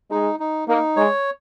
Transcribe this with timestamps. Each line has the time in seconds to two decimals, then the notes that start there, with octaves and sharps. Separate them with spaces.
0.10 G#3 D#4
0.40 D#4
0.68 A#3 D#4
0.96 G#3 C#5